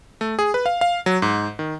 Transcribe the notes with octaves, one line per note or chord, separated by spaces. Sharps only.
A3
G#4
B4
F5
F5
F#3
G#2
D#3